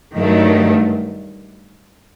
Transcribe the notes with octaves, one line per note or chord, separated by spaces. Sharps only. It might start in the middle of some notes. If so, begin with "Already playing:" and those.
G2 D#3 F#3 A3